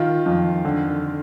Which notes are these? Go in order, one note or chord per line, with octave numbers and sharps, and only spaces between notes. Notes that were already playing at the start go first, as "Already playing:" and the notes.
Already playing: D#3 F4
F2
D3